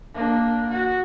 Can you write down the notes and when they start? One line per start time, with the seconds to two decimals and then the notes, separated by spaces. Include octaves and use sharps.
0.14 A#3 D4
0.70 F#4